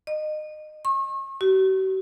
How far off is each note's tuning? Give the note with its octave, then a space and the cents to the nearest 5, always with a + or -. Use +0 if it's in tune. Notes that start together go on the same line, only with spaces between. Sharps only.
D#5 -25
C#6 -40
F#4 +45